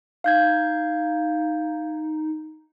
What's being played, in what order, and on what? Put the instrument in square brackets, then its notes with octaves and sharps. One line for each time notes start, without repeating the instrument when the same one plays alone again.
[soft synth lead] D#4 [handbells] F5 G6 G#6